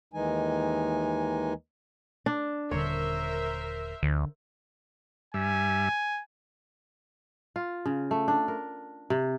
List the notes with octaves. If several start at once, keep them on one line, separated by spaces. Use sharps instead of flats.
D#2 D#3 E3 G#3 D#4 G#5
D4
D#1 D3 A#4 C5 C#5 E5
D2 D3
G2 G3 E5 G#5
F4
C#3
A3
D4
A#4
C3